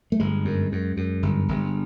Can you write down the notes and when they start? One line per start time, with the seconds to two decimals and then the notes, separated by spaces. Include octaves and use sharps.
0.12 A3
0.20 G1 G#3
0.45 F#2
0.72 F#2
0.97 F#2
1.23 G1
1.49 G1